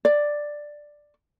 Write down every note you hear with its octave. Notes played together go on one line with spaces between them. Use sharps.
D5